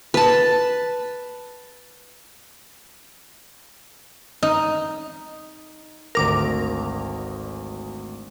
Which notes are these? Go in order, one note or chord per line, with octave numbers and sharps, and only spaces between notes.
B4 A5
D#4
G#1 D2 A#4 D6 A#6